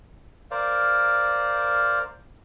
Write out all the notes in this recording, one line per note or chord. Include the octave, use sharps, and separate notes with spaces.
A#4 C5 D5 F5